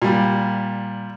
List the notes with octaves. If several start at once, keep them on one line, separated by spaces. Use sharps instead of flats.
A#2 G3